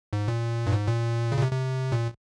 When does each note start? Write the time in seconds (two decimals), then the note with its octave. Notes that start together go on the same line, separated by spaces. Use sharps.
0.13 G#2
0.28 A#2
0.67 G2
0.72 G#2
0.88 A#2
1.32 C#3
1.38 A#2
1.42 C3
1.52 C3
1.92 A#2